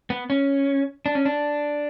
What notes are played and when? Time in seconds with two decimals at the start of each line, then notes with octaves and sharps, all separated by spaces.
0.10 B3
0.30 C#4
1.06 D4
1.15 C#4
1.25 D4